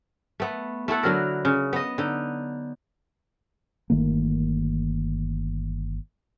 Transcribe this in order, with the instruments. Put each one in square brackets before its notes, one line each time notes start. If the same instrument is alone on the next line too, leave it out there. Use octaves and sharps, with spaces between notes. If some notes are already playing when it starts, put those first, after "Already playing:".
[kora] A3 B3
A3 E4 A4 F#5
D3 F#3 A#4
C#3
B3 D#5
D3 D#4
[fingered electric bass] G1 D#3 A3 A#3